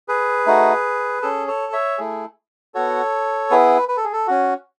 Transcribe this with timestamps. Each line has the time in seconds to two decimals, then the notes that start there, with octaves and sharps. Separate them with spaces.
0.08 G#4 B4
0.46 A3 D#4 F#4
1.22 C#4 G#4 A4
1.47 A4 C#5
1.73 C#5 E5
1.98 A3 E4 G#4
2.74 B3 F#4 A4 C#5
3.50 B3 E4 G#4 B4
3.89 B4
3.97 A4
4.04 G#4
4.13 A4
4.27 C#4 F#4